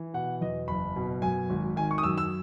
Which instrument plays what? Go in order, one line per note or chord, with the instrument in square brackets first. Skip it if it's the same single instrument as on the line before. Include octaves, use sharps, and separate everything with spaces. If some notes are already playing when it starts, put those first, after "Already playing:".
Already playing: [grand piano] E3
B2 F#5
E2 D#5
F#1 B5
B2
F#2 G#5
G#1
D#3 G#5
C#6
D#6
F#2 E6
E6